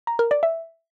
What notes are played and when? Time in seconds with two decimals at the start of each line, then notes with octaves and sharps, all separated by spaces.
0.07 A#5
0.19 A#4
0.31 D5
0.43 E5